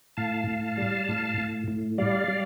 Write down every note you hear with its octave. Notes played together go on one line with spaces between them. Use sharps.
A2 F5 A5
A2
G3
A2
A2
A2
G3 D5 F5
G3